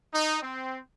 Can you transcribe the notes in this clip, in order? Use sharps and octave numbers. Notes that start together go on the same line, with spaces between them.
D#4
C4